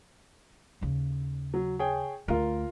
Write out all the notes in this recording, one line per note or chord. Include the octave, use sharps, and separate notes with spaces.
D#2 C#3
F#3
G#4 C#5 G5
D2 F4 A#4